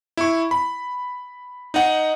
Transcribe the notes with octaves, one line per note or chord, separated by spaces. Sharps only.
E4 C#6
B5
D#4 D#5 F#5